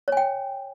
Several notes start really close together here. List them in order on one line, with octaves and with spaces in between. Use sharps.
C#5 G#5 G5